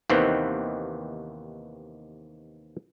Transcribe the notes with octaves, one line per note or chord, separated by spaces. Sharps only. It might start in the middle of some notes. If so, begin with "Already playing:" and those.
D#2 C3 D#3 E3 B3 C4